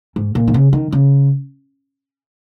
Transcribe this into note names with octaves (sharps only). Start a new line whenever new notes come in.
G#2
A#2
D#3
C#3
D#3
C#3